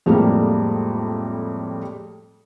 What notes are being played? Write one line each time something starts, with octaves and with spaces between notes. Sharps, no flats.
F2 A2 G3 G#3 A#3